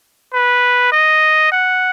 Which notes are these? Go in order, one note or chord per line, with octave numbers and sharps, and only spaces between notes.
B4
D#5
F#5